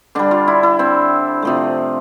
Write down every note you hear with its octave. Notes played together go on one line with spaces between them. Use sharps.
D3 G3 D4
F4
E4
E4
C4
C3 F3 A3